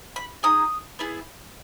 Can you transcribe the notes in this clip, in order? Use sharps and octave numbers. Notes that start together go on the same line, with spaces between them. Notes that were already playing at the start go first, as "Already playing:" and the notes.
B5
D#4 G#4 D#6
B3 E4 G#4